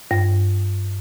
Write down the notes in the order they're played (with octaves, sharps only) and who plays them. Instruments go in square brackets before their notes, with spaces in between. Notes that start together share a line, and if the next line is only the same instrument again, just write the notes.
[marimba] G2